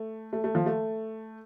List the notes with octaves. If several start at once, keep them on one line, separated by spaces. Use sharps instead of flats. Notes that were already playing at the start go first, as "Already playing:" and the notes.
Already playing: A3
A3
A3
F3
A3